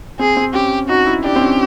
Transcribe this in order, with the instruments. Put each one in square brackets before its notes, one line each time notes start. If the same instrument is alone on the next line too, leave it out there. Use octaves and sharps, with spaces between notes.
[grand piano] C4 [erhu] G#4
[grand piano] C4
[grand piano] C#4 [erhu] G4
[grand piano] D#4 [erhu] F#4
[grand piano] E4
[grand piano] D4 [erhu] G4
[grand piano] C4
C#4